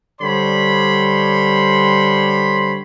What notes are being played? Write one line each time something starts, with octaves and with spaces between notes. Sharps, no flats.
D3 G3 C5 C#5 B5 C6